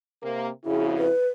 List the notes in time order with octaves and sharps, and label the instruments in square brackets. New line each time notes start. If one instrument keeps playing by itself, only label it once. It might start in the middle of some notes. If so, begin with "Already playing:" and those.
[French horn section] C3 A#3
[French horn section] F2 C#3 F#4 [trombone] E4 [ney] G#4
[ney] B4